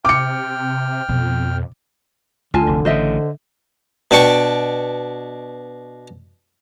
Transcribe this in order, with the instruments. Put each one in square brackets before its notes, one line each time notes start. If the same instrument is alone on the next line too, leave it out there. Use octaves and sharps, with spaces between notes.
[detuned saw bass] C3 [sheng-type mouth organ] G5 F6 [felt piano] D6 C#7
[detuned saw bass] F2 [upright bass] B2
[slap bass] C#2 [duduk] D3 [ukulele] F4 G#5 A5
[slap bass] F1 D2
[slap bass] A1 C#3 [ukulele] C5 D#5 E5
[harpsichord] B2 D4 G5 C#6 D6